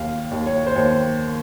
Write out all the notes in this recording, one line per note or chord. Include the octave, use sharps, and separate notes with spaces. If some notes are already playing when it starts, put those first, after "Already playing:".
Already playing: D#2 F5
D#2
C#5
C5
D#2 C#5